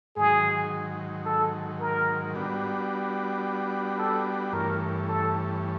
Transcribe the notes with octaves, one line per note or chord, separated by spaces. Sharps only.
G#2 D#3 F#3 G#4
A4
A#4
G3 B3 D4 F#4
A4
G2 E3 A3 C#4 A#4
A4